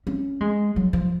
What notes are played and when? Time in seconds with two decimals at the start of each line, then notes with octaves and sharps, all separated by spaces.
0.07 C#4
0.41 G#3
0.76 F#3
0.93 F3